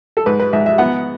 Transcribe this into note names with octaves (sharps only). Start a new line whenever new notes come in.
A4
G#2 B4
B4
G#2 E5
E5
B3 F#5